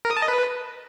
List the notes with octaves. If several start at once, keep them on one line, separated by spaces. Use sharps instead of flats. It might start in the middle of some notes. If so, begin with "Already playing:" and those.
A#4
D#6
A5
D#5
B4